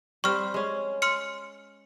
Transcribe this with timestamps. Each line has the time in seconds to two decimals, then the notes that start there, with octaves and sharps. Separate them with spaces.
0.24 G3 C4 C5 C#6 F6
0.54 G#3 C#4
1.02 C6 F6 C#7